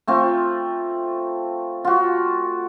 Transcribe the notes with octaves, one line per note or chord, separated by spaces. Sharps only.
A3 C4 F4
F4 F#4